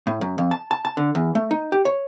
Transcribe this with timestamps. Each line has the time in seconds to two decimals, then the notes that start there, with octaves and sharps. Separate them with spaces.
0.07 A2
0.21 F#2
0.38 F2
0.51 A5
0.71 A5
0.85 A5
0.97 D3
1.15 E2
1.35 A3
1.51 D#4
1.72 G4
1.85 C#5